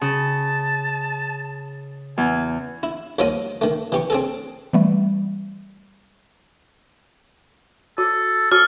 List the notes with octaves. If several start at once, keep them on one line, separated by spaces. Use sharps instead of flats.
C#3 A5
E2 G#5
E4
D#2 F3 F#3 F4 D#5 D#6
D#3 A3
E3 G4 C#6
C4 G#4 A4
E3 G3 A3
F#4 A4
F#4 A4 E6 F6